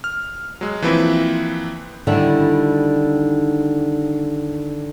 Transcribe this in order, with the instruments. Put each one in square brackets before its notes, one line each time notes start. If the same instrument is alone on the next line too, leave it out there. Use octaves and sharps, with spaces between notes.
[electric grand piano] F6
F#3 G#3
E3 F3 A#3 C4 E4 B4
[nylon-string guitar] D3 D#3 G3 E4